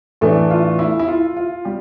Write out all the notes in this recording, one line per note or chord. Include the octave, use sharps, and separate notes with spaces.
A2 E3 A3 D4 A4
F4
E4
E4
F4
F4
G3 G4